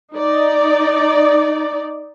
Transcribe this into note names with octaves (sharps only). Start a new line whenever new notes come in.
D#4 D5